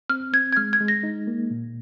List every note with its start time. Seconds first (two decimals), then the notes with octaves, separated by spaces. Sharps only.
0.09 C4 F6
0.33 C4 G#6
0.53 G#6
0.57 G#3 F6
0.73 G#6
0.80 G#3
0.88 A#6
1.03 D#4
1.27 A#3
1.51 A#2